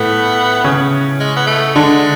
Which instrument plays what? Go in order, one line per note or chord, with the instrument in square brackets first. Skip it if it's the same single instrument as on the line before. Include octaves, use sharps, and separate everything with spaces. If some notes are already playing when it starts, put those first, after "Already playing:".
Already playing: [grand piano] A2 A3 [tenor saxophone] B3
[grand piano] C#3 C#4
[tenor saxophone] G#3
B3
A3
[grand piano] D3 D4 [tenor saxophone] G#3